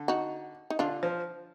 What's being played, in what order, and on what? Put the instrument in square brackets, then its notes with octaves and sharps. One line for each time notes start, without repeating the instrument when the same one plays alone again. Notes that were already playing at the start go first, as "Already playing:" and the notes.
Already playing: [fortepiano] D3
[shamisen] D#4 F#4
D#4
[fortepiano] D3 [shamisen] D4 F4
[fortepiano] F3